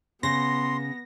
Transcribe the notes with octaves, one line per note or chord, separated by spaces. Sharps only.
C#3 B3 C6 A#6